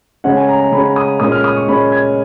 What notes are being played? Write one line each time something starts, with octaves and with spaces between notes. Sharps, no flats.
C#3 G#3 C#4 F#5
G#5
A#5
A#5
C#3 G#3 C#4 B5
D#6
A#2 G#3 C#4 D#6
F6
D#6
C#6
A#2 G#3 C#4 B5
G#6